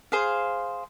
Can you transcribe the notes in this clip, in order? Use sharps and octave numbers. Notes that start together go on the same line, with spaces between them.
G#4 C5 F5